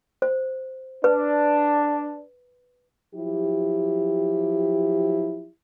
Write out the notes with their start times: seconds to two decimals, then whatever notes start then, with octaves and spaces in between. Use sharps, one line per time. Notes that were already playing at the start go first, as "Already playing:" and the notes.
0.22 C5
1.04 D4 B4
3.15 F3 F#3 E4 G4